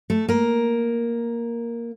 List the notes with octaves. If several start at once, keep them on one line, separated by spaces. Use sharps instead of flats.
A3 A4
A#3 A#4